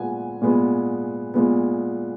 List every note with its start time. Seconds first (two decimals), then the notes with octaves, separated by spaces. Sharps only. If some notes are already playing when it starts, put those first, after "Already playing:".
Already playing: A#2 G#3 B3 F#5 G#5
0.42 A#2 G#3 B3
1.34 A#2 G#3 B3